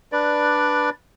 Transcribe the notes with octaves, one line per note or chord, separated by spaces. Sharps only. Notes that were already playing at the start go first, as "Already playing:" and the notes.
D4 B4 D5